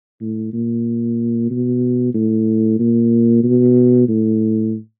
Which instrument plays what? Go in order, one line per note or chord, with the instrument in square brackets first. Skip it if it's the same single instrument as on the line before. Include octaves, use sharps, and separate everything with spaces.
[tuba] A2
A#2
B2
A2
A#2
B2
A2